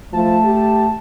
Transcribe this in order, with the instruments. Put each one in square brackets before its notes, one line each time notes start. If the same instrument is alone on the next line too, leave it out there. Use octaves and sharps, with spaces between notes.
[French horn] F3 [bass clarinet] A3 [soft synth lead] A5
[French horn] G4